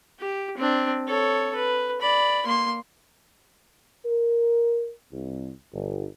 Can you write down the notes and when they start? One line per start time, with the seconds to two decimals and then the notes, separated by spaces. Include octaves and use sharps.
0.19 G4
0.57 C4 D4
1.07 A4 C#5
1.55 B4
2.01 D5 B5
2.46 A#3 C6
4.05 A#4
5.12 C2
5.73 G1